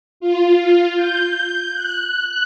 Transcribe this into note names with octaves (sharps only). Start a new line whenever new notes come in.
F4
G6
F#6